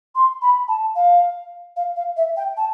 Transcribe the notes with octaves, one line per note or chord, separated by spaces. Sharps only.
C6
B5
A5
F5
F5
F5
E5
G5
A5